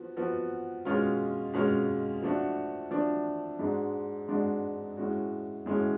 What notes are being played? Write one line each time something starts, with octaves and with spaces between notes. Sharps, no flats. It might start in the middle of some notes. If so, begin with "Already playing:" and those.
Already playing: F3 B3 F#4
F3 B3 F#4
B2 G#3 C#4 F4
B2 G#3 C#4 F4
F3 A3 D4 F#4
F3 A3 D4 F#4
G#2 G#3 D4 F#4
G#2 G#3 D4 F#4
A2 G#3 C#4 F#4
A2 G#3 C#4 F#4